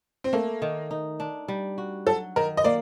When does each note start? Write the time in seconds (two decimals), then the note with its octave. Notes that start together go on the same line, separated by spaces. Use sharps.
0.24 C4
0.33 A3 A#3
0.62 D#3
0.91 D#4
1.20 D4
1.48 G3
1.78 F#4
2.07 F#3 A4
2.36 D#3 A#4
2.57 D#5
2.64 A#3 D5